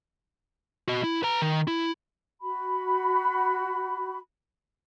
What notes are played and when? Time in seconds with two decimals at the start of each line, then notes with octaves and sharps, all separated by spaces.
0.88 F#4 D#5
1.04 E4
1.23 B4 A#5
1.42 D#3
1.67 E4
2.42 F#4 B5